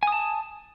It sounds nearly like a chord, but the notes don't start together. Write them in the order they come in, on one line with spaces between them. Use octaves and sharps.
G#5 D#6 A5